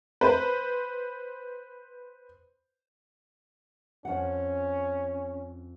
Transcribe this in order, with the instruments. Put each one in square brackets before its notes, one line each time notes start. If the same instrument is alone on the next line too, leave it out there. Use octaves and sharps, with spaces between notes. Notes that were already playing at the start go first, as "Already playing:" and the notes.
[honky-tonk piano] B4 C5
[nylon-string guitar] F2 F#5 [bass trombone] C#4